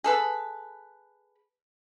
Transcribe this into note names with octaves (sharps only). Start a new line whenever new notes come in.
G#4 A4 B4